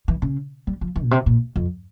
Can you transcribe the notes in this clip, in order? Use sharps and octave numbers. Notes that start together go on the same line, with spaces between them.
E3
C#3
G3
F3
E3
A#2
C3
A#2
F2